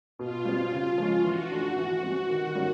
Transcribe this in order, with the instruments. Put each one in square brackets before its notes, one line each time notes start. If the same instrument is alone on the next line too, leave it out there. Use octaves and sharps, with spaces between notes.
[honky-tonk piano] B2 [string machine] F4
[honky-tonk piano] G3 C4
C#3
F3 G#3 C#4
[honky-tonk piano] E3 [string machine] F#4
[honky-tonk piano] A3 D4
[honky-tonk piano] E3 [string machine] F#4
[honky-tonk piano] G3 C4
D#3
G3 A#3 C#4 F#4